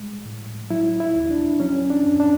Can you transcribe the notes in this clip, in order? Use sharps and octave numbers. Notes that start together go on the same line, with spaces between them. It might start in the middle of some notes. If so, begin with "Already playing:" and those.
Already playing: C2 G3 G#3
A2
F#3 E4
E4
D#2
D4
F#3 C#4
D4
F#2
D4